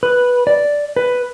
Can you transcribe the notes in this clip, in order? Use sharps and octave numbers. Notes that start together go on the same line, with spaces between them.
B4
D5
B4